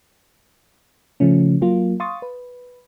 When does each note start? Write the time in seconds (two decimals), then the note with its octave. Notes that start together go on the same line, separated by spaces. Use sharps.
1.20 C#3 F3 A3 C#4
1.61 F#3 A#3 F4
2.00 F5 C6 C#6 D#6 A6
2.22 B4